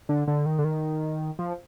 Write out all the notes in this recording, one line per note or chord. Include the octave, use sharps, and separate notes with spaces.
D3
D3
D#3
D3
D#3
F3